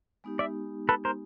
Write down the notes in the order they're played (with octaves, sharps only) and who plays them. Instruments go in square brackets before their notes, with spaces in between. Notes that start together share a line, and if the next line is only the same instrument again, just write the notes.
[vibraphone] G#3 B3 D#4 G4
[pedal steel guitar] D5 E5
A4 B4
A#4 C5